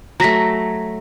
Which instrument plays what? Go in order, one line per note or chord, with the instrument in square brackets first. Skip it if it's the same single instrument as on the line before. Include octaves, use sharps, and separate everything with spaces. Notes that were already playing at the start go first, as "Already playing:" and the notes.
[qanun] F#3 A3 [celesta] A#5 A#6 B6